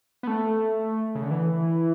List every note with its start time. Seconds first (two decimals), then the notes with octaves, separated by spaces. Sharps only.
0.23 B3
0.27 A3
1.15 C#3
1.23 D3
1.31 E3